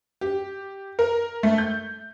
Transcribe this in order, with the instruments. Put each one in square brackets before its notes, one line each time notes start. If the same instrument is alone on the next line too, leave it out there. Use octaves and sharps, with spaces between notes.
[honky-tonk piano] G4
A#4
A3
G6